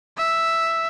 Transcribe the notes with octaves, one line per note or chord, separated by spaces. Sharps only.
E5